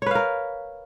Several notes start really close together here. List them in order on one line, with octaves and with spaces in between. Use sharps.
C#5 B4 F5 A#4